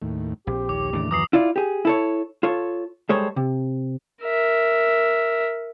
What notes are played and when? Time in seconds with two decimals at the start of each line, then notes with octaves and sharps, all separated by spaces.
0.02 D#2 A2
0.47 A#1 C4 G4
0.69 D#2 C#5 D6
0.93 D#2 A2 C#3 E3 D4
1.11 F#2 E3 A#5 D6 D#6 C7
1.33 E4 F4 D5
1.56 G4 G#4
1.85 E4 A4 C#5
2.43 F4 A4 C#5
3.09 G3 G#3 A4 C5 C#5
3.36 C3
4.24 A#4 E5